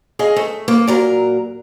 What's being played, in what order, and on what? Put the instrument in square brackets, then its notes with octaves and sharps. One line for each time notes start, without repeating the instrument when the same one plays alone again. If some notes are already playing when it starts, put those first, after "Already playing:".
[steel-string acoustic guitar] G#4 D#5 F5
A3
A#3
A#2 F#3 A#4